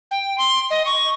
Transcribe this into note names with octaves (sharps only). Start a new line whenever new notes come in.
G5
C6
D#5
C#6